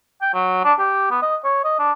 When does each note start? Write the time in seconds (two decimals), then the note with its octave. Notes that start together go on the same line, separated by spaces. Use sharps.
0.22 G5
0.34 F#3
0.64 D4
0.79 G4
1.11 B3
1.22 D#5
1.44 C#5
1.65 D#5
1.79 D4